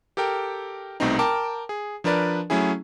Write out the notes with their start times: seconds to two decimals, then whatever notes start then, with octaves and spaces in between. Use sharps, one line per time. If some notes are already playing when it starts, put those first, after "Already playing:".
0.17 G4 A4 A#4 G5
1.00 C2 B2 A3 C4 D#4
1.19 A#4 G5 A5 D6
1.69 G#4
2.04 F3 D4 A#4 B4 D5
2.50 F#3 A3 C#4 E4 G#4